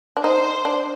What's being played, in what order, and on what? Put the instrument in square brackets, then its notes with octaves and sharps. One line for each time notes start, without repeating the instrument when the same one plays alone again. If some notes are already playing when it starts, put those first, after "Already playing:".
[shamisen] D4
[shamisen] D#4 [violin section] C5
[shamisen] D4